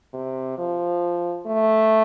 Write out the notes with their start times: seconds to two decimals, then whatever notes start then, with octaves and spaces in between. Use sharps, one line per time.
0.13 C3
0.57 F3
1.47 A3